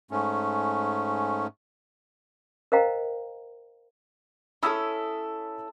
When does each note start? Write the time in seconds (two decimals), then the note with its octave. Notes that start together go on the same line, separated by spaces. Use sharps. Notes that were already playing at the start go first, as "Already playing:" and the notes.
0.11 G#2 A3 C#4
2.72 A#4 C5 D#5 F5 G5 A#5
4.63 C#4 E4 A4 B5 D#6 E6